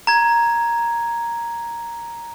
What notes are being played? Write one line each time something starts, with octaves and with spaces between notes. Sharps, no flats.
A#5 G#6